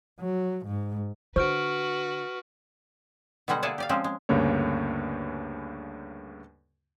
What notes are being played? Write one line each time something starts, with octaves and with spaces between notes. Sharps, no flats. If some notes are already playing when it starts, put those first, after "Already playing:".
F#3
G#2
D3 F#4 B4 C5 C#6 F6 D7
B2 D3 G3 G#3 F#4 F#5
A#3 G#4 A4 D5 E5 F#5
G4 D5 F5
F3 G#3 C4 C#4
G#3
D2 G2 C#3 A#3 C#5